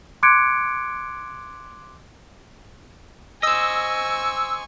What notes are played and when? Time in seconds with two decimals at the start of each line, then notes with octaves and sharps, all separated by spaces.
0.23 C6 D6 F#6 G#6 C#7 D7
3.43 C5 D#5 G#5 C#6 E6